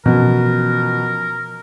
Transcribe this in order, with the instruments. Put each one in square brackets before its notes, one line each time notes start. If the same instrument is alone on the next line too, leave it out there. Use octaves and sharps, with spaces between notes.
[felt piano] B2 [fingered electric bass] E3 F3 C#4 [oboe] A#4